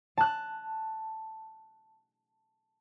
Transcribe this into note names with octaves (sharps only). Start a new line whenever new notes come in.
A5 F#6